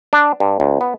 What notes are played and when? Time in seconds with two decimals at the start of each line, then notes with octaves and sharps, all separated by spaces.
0.13 D4
0.40 G2
0.60 C#2
0.81 B3